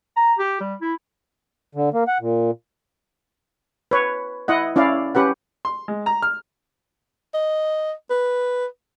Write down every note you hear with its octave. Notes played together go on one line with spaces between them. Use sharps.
A#5
G4
G3
E4
D3
A#3
F#5
A#2
B4 C#5
E4 D#5 F#5
C#4 E4 D5 F5
C#4 G4 B4 F#5
C6
G#3
A#5
F6
D#5
B4